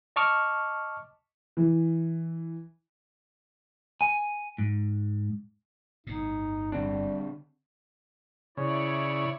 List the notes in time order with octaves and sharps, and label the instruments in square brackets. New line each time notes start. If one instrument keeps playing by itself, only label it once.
[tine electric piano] D#5 A5 C#6 D6 F6
[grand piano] E3
[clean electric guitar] G#5
G#2
[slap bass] G1 A2 [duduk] D#4
[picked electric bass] D3 C4 D4 [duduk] G3
[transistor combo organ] C#3 [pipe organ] E4 C#5 D5